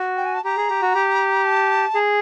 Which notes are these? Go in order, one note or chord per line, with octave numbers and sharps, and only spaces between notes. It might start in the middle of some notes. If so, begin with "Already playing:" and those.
Already playing: F#4
G5
G#5
A5
G4 A#5
G#4
G4
F#4
G4
A5
G#4